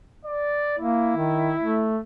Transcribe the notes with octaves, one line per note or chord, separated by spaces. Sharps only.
D5
A#3 E4
D#3
A3